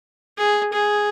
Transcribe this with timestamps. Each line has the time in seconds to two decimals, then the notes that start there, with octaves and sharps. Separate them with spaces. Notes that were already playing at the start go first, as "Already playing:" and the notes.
0.38 G#4
0.73 G#4